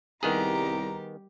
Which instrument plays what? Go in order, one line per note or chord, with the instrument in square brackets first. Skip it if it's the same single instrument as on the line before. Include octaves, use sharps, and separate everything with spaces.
[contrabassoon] C2 [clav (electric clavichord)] D#3 B3 G#4 [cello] G3 G4 [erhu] A#5